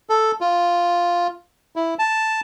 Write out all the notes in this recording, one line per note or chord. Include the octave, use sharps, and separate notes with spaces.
A4
F4
E4
A5